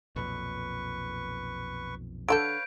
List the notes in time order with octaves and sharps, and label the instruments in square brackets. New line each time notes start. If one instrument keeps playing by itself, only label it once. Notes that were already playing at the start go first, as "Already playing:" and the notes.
[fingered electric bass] B1 F2 A#2 [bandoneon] B4 C#6
[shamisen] D3 F4 A4 [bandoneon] B4 C#5 F5 [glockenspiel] G6 D7